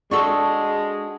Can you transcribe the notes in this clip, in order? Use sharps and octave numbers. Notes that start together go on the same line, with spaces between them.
G#3 D4 F#4 A4 C#6 E6